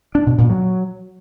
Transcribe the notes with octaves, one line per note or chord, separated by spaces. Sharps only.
D4
B2
A#2
F#3